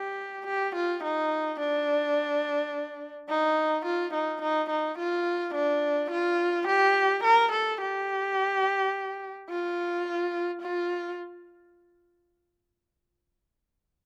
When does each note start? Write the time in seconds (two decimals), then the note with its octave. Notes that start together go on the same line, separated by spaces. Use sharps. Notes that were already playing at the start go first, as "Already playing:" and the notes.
Already playing: G4
0.47 G4
0.75 F4
1.04 D#4
1.60 D4
3.29 D#4
3.85 F4
4.14 D#4
4.42 D#4
4.70 D#4
4.98 F4
5.55 D4
6.11 F4
6.68 G4
7.24 A#4
7.52 A4
7.81 G4
9.50 F4
10.62 F4